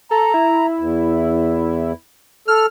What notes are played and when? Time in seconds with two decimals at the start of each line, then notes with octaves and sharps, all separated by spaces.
0.11 A4 A#5
0.34 E4
0.79 E2
2.48 A4 F6